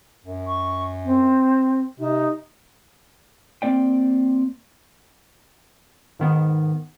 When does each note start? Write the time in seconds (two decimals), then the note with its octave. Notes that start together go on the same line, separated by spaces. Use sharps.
0.25 F#2
0.47 C#6
1.05 C4
2.00 C3 D#4
3.62 A#3 C4 D5 G5
6.19 G#2 D#3 B3